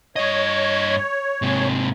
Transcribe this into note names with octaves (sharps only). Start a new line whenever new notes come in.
G2 C#5 D#5
G#2 C3